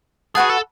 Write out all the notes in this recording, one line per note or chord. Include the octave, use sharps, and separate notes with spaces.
F#4 G#4 B4 F#5 A5
A4